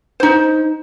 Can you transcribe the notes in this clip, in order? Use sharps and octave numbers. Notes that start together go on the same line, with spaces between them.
D#4 C5